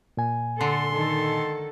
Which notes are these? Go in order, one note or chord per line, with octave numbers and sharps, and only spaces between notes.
A#2 G#5
D3 A4 C6
D#3 A4